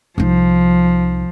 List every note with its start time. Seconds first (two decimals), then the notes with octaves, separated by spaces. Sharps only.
0.18 C2 F3 D#4